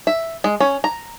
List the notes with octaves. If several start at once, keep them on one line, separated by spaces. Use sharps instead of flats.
E5
G#3
C#4
A#5